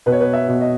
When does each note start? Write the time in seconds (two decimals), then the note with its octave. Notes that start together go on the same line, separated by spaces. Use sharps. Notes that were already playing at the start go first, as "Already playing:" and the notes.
0.06 B2 B4
0.12 C#5
0.21 B4
0.33 E5
0.48 B2
0.61 D#5